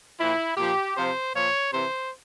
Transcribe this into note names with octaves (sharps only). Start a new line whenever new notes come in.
A#2 F3 E4
A#2 F3 G4
C3 F3 C5
A#2 F3 C#5
C3 E3 C5